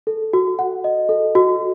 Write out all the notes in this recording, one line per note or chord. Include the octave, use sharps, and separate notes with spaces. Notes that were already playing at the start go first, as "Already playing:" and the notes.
A4
F#4
F#5
D#5
A4
F#4